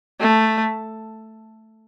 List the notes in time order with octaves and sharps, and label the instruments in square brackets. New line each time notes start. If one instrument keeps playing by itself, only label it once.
[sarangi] A3